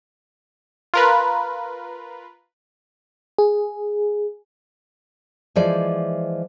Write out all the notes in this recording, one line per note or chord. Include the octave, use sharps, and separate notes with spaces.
F4 A#4 B4
G#4
E3 F3 G#3 C5 D5